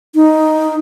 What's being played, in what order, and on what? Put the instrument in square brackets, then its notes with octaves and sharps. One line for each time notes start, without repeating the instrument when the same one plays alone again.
[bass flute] D#4